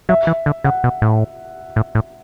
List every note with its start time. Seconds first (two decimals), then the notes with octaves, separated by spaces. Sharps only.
0.09 F#3 E5
0.27 E3
0.46 D3
0.64 C#3 F#5
0.84 B2
1.02 A2
1.76 A2
1.95 A2